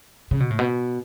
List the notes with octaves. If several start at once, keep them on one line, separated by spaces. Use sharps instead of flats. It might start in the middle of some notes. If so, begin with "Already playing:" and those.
C#3
B2
A2
B2